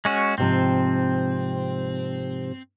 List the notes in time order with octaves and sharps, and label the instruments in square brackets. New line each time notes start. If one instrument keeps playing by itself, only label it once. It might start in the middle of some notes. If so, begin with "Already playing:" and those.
[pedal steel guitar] G#3 C#4 F#4
[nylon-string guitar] G#2 C3 F3 [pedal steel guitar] C4